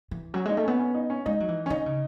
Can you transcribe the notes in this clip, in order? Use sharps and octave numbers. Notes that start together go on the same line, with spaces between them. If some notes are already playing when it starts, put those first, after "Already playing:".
E3
F#3 C#4
G#3 D#4
A3
B3 C#4
C#4
D#4
C#4
G#3 D#4
F#3
E3
C#4
D#3 D#4
C#3